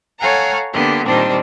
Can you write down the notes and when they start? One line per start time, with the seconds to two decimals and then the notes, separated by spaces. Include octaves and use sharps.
0.19 A4 C#5 F5 F#5 G#5 A#5
0.72 D3 A#3 B3 G4
1.06 A#2 D#3 G3 C4 D4